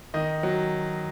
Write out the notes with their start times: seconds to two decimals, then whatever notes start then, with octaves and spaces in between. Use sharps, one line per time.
0.14 D#3 D#5
0.43 F#3